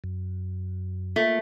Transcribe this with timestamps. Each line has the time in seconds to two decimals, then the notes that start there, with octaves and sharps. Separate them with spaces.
0.04 F#2
1.16 A3 A#3 F4